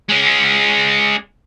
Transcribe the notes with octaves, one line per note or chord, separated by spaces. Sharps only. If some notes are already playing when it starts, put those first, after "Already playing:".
G#3 C#4